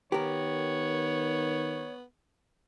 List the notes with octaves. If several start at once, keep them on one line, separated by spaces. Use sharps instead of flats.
D#3 B3 G4 A#4 C#5